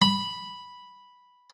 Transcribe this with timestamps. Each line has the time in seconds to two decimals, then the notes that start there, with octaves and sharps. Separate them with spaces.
0.02 B5